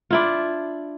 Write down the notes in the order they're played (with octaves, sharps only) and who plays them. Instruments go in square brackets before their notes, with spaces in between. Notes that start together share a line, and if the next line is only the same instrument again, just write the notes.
[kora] D4 E4 F4